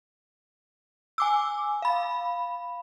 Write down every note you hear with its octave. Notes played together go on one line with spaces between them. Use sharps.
G#5 D6 E6
F5 B5